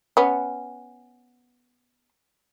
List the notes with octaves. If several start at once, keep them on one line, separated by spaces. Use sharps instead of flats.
B3 C#4